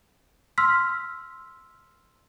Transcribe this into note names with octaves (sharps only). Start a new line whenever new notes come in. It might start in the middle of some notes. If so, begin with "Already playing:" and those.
C6 E6 F6 B6